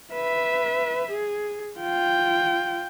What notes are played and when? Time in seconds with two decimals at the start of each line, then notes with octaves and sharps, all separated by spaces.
0.12 B4 E5
1.10 G#4
1.79 F4 G5